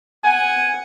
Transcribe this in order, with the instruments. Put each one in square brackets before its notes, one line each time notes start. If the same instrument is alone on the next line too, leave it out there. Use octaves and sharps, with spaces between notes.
[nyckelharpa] F#5 [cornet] G#5